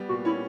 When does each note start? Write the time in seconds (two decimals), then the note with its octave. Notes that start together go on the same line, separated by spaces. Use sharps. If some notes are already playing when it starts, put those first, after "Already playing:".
Already playing: G3 B3
0.09 A#2 F#4
0.25 C#4 E4